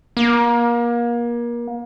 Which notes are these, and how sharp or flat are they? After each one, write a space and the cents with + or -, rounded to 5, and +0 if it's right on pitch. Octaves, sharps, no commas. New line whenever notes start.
A#3 +30